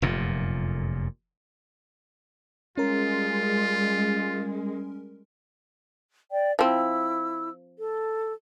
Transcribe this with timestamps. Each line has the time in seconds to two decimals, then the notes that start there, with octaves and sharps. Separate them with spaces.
0.02 F1 F#2 A#2
2.78 G3 G#3 C#4 F4 A#4
6.31 D5 G5
6.59 F3 C4 E4 E6
7.77 A4